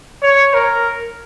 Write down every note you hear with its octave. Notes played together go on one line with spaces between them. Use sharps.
C#5
A#4